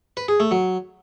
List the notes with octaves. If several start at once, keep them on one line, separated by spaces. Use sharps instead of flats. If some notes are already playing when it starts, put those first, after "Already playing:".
B4
G#4
A3
F#3